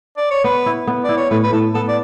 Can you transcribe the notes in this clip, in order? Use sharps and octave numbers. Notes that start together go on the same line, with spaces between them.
D5
C#5
B3 B4
E4
B3
E4 D5
C#5
A2 B4
B4
A2 A4
B3 A4
D5